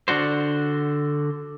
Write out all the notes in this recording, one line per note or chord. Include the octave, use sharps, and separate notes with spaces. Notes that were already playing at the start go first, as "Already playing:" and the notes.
D3 D4 F#4 C5